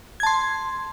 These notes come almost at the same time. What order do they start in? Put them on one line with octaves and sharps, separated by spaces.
G#6 A5 C6